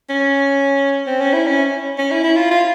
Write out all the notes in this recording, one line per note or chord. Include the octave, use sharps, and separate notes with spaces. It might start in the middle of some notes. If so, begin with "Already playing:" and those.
C#4
C4
C#4
E4
C#4
C#4
E4
E4
F4
F4